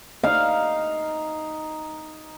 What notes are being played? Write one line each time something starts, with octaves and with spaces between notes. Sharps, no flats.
D#4 F5